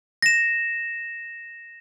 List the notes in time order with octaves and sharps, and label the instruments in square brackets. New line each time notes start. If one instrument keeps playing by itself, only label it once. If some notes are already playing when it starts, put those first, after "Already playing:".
[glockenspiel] A#6 E7